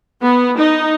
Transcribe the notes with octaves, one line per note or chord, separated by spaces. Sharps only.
B3
D#4